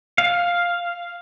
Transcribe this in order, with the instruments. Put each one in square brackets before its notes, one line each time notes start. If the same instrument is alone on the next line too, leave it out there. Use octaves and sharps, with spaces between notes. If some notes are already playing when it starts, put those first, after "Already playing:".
[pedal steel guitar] F5